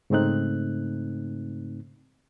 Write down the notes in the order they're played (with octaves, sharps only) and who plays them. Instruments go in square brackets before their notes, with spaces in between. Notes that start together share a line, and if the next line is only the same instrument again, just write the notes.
[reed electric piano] G#2 C#3 A3 C4 D#4 F#6